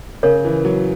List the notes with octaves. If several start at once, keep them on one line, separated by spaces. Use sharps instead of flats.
C#3 A#4 C#5
E3
F#3